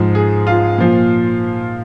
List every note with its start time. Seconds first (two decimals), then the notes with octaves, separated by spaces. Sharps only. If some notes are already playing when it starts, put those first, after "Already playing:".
Already playing: G#2 F3
0.15 G#4
0.47 F4
0.78 A#2 F3